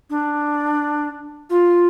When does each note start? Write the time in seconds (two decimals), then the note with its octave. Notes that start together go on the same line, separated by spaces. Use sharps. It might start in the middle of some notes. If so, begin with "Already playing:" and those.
0.10 D4
1.50 F4